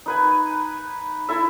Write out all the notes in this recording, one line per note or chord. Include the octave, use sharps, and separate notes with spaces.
D#4 B4 G#5
E4 A4 E5